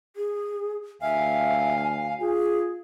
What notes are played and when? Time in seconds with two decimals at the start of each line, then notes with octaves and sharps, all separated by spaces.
0.16 G#4
1.02 D2 E5 F5 G#5
2.21 F4 G#4